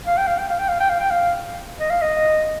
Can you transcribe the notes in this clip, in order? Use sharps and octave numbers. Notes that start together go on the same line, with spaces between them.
F5
G5
F5
G5
F5
G5
F5
G5
F5
G5
F5
D#5
F5
D#5